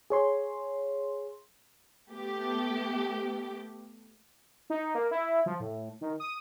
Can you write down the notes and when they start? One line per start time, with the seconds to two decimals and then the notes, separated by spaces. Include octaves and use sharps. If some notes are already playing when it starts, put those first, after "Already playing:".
0.10 G#4 C#5 C6
2.10 A3 B3 G4
4.70 D#4
4.95 A#3
5.11 E4
5.46 F3
5.60 A2
6.01 D#3
6.20 D#6